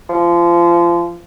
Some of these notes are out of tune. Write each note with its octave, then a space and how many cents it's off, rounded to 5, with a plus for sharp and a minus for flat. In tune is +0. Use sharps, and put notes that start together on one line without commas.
F3 -25